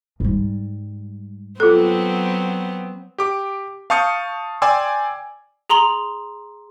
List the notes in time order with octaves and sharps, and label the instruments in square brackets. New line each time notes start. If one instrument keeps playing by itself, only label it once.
[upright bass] G#2 G3
[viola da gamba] F#3 B3 C4 [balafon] F4 A4
[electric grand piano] G4 D6
F5 A5 C#6 D#6 G6 C#7
D5 G5 G#5 C6 D6 E6
[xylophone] G#4 A#5 C6 F#7